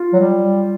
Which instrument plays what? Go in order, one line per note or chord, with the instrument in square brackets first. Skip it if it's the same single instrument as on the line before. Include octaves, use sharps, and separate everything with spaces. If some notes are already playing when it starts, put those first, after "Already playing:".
Already playing: [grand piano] F4
[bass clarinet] F#3
G3